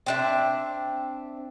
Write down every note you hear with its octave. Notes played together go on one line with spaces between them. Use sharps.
C4 D4 E5